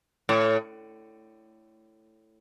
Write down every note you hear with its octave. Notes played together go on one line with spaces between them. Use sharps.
A2